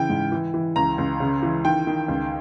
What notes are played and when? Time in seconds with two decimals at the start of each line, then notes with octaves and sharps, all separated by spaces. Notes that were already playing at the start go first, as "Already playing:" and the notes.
Already playing: C#3 E3 G5
0.09 G#2
0.32 E3
0.54 E3
0.76 C#2 A#5
0.98 C#2
1.20 C#3
1.43 E3
1.65 D#3 G5
1.87 D#3
2.08 C#2